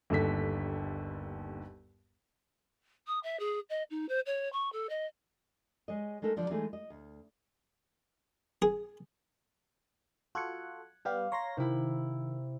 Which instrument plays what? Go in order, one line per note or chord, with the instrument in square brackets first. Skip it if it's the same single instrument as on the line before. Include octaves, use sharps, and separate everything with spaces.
[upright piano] G1 D#2 D3 B6
[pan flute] D#6
E5
G#4
D#5
D#4
C5
C#5
C#6
A4
D#5
[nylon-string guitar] G#3 C#5 D#5
G#3 A3 D#4 A4 A#4
D3 F3 D5
E3 G#3 A3 D#4 G#4
D#5
D2
[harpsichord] G#4
[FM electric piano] F4 F#4 A4 [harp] F#6 G#6 C#7
[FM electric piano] G3 B3 G4 [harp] F5
[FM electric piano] C#5 C6 A#6 [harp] A#5
[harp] C3 E4 [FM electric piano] D#3